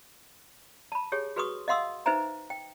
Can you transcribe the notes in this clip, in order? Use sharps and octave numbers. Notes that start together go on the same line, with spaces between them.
A5 B5
G4 G#4 C#5 G#5
F#4 G#4 B4 C6 C#6 D#6
D#5 F5 F#5 C6 D#6 E6
D#4 B4 C5 E5 G#5 A#5
G5